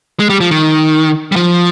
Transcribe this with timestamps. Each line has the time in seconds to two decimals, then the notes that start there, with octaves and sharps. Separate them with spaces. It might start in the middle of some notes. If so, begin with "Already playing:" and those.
0.20 G#3
0.29 G3
0.41 F3
0.51 D#3
1.32 G3
1.36 F3